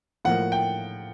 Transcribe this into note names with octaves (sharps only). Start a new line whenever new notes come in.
A2 F3 A#3 F#5
G5